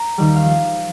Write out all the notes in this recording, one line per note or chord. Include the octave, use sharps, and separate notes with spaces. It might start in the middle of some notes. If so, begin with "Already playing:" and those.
Already playing: A#5
D#2 D#3 G3
F5
F3